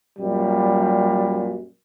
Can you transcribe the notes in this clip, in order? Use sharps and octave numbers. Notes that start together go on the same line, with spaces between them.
F#2 A#2 G3